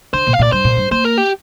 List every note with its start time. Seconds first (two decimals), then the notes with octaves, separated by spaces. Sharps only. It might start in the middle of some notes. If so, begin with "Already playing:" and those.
0.13 D3 C5
0.27 A#2
0.33 F5
0.39 A#2 D5
0.52 G2 C5
0.64 A#2
0.77 G2
0.91 A#3 C5
1.04 A#4
1.18 G4